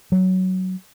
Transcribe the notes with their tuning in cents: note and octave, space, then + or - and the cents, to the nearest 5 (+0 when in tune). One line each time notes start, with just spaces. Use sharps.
F#3 +10